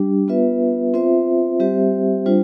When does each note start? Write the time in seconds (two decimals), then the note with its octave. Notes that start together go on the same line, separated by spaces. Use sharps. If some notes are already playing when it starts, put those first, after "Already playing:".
Already playing: G3 D4 G4
0.28 B3 F4 B4 E5
0.94 C4 F4 C5 E5
1.60 G3 C4 G4 C5 E5
2.26 G3 D4 F4 C5